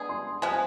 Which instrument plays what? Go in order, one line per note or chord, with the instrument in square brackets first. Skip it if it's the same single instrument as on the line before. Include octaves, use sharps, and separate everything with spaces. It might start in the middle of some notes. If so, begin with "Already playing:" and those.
Already playing: [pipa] G#3 B3 D4 G#4
[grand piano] C6
[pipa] F3 G#3 B3 [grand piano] G#5